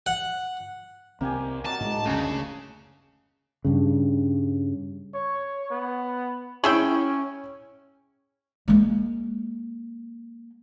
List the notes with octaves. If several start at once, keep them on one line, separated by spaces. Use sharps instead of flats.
F#5
C2 C3 A#3 C4 G4 G#5
F#3 D5 D#5 A5
A2 G#3
F#1 D2 C#3 D4 G#4
G2 C#3
C#5
B3
C#4 E4 G#4 E5 G5 C#6
G#3 A#3